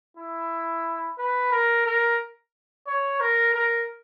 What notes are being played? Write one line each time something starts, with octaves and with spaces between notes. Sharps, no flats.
E4
B4
A#4
A#4
C#5
A#4
A#4